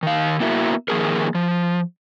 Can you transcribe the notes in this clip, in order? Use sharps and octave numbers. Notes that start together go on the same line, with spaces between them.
D#3 F5
A#3 B3 E4 F#4 A#4 E5
D#3 F3 A#3 G#4 A#4
F3